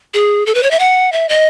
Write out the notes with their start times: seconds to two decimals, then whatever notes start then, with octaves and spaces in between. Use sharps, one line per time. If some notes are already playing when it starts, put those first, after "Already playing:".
0.14 G#4
0.46 A4
0.55 B4
0.63 C#5
0.71 E5
0.79 F#5
1.12 E5
1.29 D#5